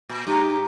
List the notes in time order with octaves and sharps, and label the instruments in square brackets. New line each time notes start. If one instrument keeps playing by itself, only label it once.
[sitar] A#2
[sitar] G2 [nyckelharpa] G4